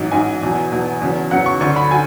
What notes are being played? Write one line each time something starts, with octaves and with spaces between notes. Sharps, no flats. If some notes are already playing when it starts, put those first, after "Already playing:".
Already playing: A1 G#2 F#3
A1 G#2 F#3 G#5
E2 B2 F#3
E2 B2 F#3
E2 C#3 F#3
E2 C#3 F#3 F#5
C#6
D2 D3 F#3 C#6
B5
F#3 G#5